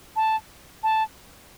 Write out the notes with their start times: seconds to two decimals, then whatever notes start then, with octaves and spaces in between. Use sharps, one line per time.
0.16 A5
0.83 A5